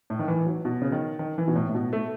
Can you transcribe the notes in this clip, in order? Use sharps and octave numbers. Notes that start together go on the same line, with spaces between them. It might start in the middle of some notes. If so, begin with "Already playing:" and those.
A2
D#3
E3
F#3
B2
C#3
D#3
D#3
E3
B2
A2
A2
B2
A3